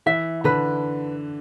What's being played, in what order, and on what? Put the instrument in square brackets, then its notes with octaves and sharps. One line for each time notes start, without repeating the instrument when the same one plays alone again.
[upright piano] E3 [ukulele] E5
[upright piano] D3 [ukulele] B4